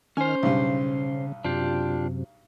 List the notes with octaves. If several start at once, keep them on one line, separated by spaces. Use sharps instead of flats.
D#3 C#4 C5 G#5 F6
B1 G2 C#3
F#2 C3 D4 F4 G4